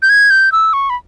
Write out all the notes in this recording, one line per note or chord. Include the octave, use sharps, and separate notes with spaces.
G6
G#6
G6
E6
C#6
B5